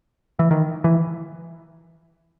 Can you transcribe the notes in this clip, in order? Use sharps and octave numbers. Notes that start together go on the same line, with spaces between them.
E3
D#3
E3